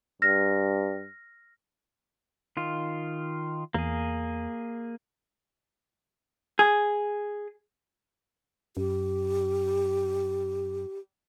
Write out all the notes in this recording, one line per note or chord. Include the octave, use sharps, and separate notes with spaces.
G2 F6 A#6
D#3 F4
E2 A#3 G#4
G#4
F#2 G4